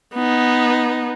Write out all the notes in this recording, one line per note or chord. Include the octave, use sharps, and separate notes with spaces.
B3 D#4